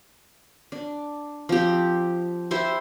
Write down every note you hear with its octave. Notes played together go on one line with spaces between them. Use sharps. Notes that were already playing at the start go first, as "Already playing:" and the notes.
D4
F3 C4 G4
E4 G4 C5